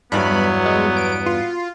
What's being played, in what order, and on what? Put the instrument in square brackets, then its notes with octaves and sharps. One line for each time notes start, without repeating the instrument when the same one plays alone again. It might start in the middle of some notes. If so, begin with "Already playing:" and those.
[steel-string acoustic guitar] E2 G2 [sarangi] F#3 [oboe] B3 [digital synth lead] B5
[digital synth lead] G#3
D7
F4